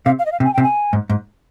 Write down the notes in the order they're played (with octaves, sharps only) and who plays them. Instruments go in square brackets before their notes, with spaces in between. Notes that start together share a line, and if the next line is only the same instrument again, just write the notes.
[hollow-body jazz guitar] C3 [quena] F5
[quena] F5
D#5
F5
[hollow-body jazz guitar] C3
[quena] G#5
[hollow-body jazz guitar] C3 [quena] G5
[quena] G#5
[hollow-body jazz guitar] G#2
G#2